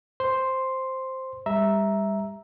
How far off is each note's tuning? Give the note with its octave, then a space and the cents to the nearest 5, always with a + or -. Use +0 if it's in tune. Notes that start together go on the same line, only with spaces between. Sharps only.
C5 +0 C6 +0
G3 +30 E5 -5 A#5 +0